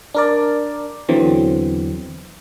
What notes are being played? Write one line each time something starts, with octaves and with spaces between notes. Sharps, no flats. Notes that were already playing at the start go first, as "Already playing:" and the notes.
D4 A#4 D5
E2 D3 E3 F#3 C4